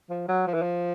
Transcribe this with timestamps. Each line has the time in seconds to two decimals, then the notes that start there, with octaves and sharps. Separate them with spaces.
0.10 F3
0.28 F#3
0.47 F3
0.54 E3
0.62 F3